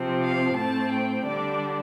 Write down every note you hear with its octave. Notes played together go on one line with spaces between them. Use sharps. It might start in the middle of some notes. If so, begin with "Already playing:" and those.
Already playing: C3 F3 C4
F5
A2 A3 C4 A5
G5
D3 G3 D4 D5